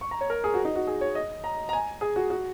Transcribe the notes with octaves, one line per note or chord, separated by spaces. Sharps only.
C#6
A#5
C#5
A#4
G#4
F#4
D#4
F#4
G#4
C#5
D#5
A#5
A#5
G#5
G#4
F#4
F#4